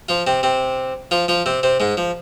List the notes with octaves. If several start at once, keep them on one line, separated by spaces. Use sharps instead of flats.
F3 F4
C3 C4
C3 C4
F3 F4
F3 F4
C3 C4
C3 C4
G#2 G#3
F3